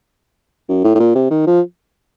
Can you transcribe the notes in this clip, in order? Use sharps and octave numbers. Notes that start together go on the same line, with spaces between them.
F#2
A2
A2
A#2
C3
D#3
F3